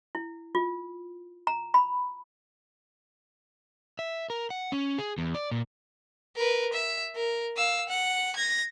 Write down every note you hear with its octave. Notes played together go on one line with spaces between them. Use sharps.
E4
F4
A#5
B5
E5
A#4
F#5
C#4
G#4
E2
D5
A#2
A#4 B4
E5
A#4
F5 E6
F#5
G#6 A#6